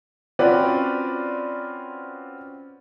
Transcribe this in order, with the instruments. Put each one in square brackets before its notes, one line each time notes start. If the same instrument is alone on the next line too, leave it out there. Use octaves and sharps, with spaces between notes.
[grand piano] C4 C#4 F4 F#4 B4 D5